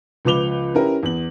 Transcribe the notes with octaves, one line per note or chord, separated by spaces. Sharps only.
C#2 F3 B4 D6 F7 G7
C#4 E4 G4 A#4 B4
E2 F#7